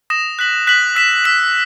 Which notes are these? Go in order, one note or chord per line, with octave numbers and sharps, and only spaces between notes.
D#6 A#6 E7
F#6 B6 F#7
F#6 B6 F#7
E6 B6 E7
E6 B6 E7